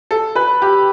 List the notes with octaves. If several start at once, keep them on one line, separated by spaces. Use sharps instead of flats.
A4
B4
G4